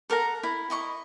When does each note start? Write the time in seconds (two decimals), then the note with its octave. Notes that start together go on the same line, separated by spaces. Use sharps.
0.10 A4 A#4 F#5 A#5
0.43 E4
0.70 E4 D#5 C#6